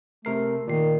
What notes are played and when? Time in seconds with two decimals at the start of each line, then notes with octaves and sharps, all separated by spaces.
0.25 C3 A3 A#4 C7
0.67 A#2 D#3 C7